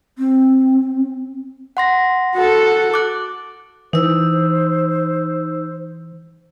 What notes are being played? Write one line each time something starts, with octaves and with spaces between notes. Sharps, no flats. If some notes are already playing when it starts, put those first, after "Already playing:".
C4
F#5 C6 A#6
F#4 A4
D6 F#6
E3 D#4 C5 E6